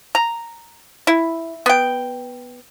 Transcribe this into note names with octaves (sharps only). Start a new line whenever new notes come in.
A#5
E4
B3 G5